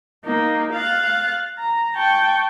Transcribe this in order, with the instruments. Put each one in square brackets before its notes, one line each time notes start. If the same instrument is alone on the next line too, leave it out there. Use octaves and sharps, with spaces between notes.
[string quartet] A#3 D#4
F5 F#6 A6
A#5
G5 A5 C#6